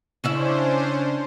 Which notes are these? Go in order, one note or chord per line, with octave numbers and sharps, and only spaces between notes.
C#3 C#4 D4 E4 C5 E5